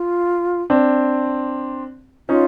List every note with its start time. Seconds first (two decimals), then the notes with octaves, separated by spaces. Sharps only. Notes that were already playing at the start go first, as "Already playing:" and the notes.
Already playing: F4
0.70 C4 D4
2.29 C#4 D#4 F4